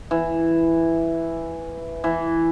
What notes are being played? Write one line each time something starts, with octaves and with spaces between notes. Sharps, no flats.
E3
E3